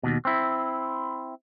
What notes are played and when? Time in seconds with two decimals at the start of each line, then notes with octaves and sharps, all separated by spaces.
0.03 D#2 B2
0.25 C4 E4